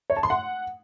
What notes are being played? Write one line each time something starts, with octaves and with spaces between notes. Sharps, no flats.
C#5
A5
C6
F#5